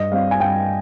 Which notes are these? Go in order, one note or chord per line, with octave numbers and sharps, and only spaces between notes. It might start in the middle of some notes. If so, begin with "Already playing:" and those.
Already playing: G2 D#5
G3 C4 F5
G#5
G2 G5